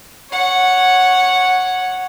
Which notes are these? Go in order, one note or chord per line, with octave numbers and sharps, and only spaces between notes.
C#5 F#5